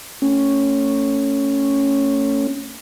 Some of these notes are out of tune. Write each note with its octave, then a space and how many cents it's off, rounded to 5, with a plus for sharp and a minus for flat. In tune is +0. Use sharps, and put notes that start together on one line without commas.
A3 +30 C#4 +0